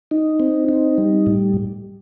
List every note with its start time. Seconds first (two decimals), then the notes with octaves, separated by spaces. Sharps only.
0.11 D#4
0.40 C4
0.69 D#4
0.98 G3
1.27 A2